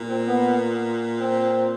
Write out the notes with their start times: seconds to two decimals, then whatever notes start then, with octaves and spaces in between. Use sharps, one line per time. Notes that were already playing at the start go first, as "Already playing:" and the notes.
Already playing: A#2
0.08 C4
0.27 B3
1.19 C4